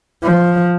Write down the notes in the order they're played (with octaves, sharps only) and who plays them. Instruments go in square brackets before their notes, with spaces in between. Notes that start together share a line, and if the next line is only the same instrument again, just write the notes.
[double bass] F3